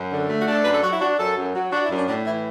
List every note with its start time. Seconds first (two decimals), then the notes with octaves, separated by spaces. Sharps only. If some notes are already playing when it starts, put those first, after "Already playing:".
Already playing: F#2
0.11 D3
0.29 A3
0.41 F#4
0.46 D4
0.53 A4
0.64 F#2 B4
0.73 A4
0.82 F#3 F#4
0.91 E4
1.00 D4 F#4
1.18 F#2 A4
1.36 F#2
1.54 F#3
1.72 D4 F#4
1.84 E4
1.90 F#2
1.96 D4
2.07 A2 D4
2.26 E3 E4